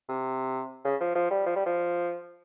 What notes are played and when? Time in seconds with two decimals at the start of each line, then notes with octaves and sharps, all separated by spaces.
0.09 C3
0.85 C#3
1.00 F3
1.15 F3
1.31 G3
1.46 F3
1.56 G3
1.66 F3